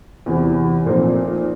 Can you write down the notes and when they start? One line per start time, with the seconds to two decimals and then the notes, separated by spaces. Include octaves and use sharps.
0.26 E2 C3 E3
0.86 A#2 F3 A3 C4 D#4